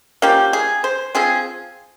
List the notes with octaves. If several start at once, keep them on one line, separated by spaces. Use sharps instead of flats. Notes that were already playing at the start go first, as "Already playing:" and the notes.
F3 A#3 C#4 G4
G#4
C5
F3 C4 G#4